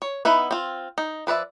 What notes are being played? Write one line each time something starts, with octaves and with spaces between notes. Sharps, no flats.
C#5
B3 D#4 E4 B4
C4 F4
D#4
F3 B4 D5 E5